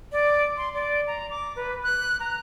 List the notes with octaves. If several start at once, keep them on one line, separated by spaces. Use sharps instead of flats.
D5
C6
D5
A#5
D6
B4
F#6
A#5